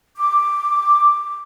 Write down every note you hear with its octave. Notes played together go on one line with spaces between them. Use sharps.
D6